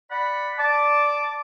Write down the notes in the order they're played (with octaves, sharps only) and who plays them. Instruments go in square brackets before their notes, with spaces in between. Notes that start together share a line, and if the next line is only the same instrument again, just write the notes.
[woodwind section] D5 F#5 B5
[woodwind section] D5 D6 [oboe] A5